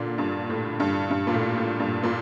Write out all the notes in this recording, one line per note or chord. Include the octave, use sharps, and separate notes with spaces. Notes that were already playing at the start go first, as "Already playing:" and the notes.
Already playing: A#2 D3
G2
A2
G2
G2
A#2
A2
A2
G2
A#2